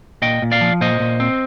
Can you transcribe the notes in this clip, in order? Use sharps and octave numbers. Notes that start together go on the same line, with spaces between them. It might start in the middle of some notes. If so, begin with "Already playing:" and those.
A#2 D#5 G5
A#2
D5 F5
F3
A#2 C5 D#5
A#2
C4